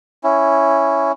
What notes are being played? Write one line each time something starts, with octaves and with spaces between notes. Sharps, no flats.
C#4 E4